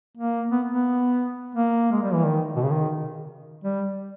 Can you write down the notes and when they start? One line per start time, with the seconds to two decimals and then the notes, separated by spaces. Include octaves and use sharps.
0.17 A#3
0.52 B3
0.72 B3
1.55 A#3
1.92 G#3
2.03 G3
2.14 E3
2.25 D#3
2.56 B2
2.63 C#3
2.71 D#3
3.64 G3